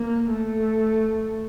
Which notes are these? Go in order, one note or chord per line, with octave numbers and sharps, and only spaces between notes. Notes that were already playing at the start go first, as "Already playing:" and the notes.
Already playing: A#3
A3